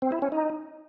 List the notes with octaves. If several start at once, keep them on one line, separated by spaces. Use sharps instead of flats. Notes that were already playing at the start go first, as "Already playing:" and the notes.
C4
E4
C#4
D#4